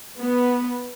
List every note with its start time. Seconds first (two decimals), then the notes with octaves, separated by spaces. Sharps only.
0.18 B3